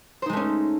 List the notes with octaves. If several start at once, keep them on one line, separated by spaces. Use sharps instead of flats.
G#3 A3 C#4 D#4 C5